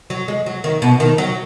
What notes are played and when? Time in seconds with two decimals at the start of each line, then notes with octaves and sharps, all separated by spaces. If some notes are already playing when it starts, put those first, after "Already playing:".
0.10 F#3
0.28 G#3
0.46 F#3
0.64 D#3
0.82 B2
1.00 D#3
1.18 F#3